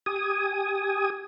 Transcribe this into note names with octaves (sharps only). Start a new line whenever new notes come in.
G4 G#5 D#6